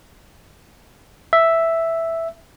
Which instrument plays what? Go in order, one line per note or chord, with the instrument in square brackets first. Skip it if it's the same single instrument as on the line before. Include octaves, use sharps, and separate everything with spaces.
[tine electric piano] E5